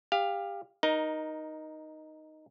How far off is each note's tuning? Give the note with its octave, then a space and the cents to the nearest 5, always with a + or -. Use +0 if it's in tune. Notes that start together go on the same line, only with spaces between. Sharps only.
G4 +25 F5 +0
D#4 +0 A#4 +20